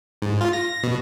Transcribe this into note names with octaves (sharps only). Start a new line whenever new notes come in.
G#2
F4
A#6
B2